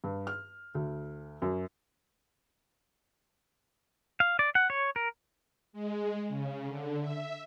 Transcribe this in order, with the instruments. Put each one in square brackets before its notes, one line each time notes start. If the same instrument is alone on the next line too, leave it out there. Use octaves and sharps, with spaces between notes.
[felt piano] G2
F6
D2
F#2
[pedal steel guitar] F5
D5
F#5
C#5
A#4
[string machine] G#3
C#3
D3
E5